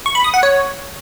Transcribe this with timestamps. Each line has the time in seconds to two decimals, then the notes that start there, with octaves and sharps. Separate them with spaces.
0.06 C#6
0.15 B5
0.24 D#6
0.34 F#5
0.43 C#5